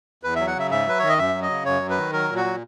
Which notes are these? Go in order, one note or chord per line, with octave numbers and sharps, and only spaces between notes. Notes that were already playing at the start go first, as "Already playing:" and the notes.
E2 B4
F#3 E5
F#5
C#3 E5
G#2 E5
F#3 B4
D#3 C#5
D#5
F#2 E5
F#3
D#5
C#3
F#2 C#5
F#3
B4
D#3
F#3 A#4
A#2
F#4
F#3